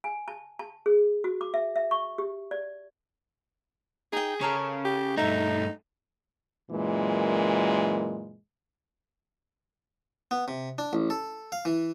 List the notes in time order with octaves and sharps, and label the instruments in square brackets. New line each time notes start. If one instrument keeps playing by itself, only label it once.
[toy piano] G#5
A5
A5
G#4
F#4
D6
E5
E5
C#6
G4
D5
[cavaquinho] D#4 G5 [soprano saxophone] G#4
[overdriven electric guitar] C#3 [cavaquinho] A4 A#4 C#5
[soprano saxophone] G4
[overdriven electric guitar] G2 A3 [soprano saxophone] D#4 [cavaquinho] E5 A#5
[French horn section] F#2 A#2 E3 G#3
[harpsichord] B3
C3
D4
A1
A4
F5
E3